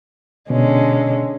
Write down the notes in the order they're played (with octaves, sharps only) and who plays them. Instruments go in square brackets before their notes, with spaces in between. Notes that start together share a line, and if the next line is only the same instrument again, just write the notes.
[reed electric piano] B2 [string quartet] D3 G#3 C#4